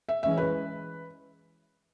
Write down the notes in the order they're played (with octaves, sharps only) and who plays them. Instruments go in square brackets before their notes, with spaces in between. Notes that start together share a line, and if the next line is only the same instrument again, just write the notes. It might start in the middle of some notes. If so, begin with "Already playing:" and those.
[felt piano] E5
[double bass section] E3 G#3 C#4 [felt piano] E5
[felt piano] B4